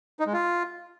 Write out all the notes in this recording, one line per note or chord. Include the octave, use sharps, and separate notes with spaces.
D#4
G#3
F4